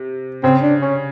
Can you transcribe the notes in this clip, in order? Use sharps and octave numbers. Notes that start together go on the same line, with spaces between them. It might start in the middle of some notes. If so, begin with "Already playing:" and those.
Already playing: C3
C#3 C4
D4
C#4